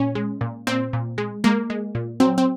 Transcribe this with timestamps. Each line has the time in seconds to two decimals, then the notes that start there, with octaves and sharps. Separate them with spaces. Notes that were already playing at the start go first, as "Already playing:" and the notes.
Already playing: A#2 C#4
0.15 G#3
0.41 A#2
0.67 A#2 C4
0.93 A#2
1.18 G#3
1.44 G#3 A#3
1.70 G#3
1.95 A#2
2.20 F#3 C4
2.38 C4